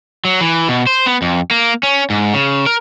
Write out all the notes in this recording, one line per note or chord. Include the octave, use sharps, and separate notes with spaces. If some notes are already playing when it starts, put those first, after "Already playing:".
F#3
E3
B2
C5
B3
F2
A#3
C#4
G#2
C#3
A#4